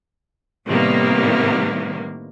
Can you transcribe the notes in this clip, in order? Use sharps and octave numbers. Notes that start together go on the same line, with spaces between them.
A2 C3 D#3 G3 A#3 B3